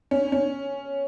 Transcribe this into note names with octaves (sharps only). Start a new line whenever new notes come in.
C#4
C#4